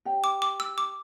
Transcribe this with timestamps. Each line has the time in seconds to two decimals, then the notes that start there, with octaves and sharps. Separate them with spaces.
0.05 G4 C#5 G5
0.24 D6
0.42 D6
0.60 E6
0.78 D6